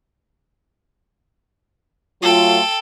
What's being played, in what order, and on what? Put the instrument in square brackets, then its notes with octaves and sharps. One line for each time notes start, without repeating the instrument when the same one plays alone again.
[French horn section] F#3 A3 F4 [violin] A4 G5